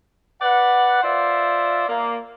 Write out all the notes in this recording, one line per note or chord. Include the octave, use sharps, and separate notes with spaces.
B4 D5 F#5
F4 C5 D5 E5
A#3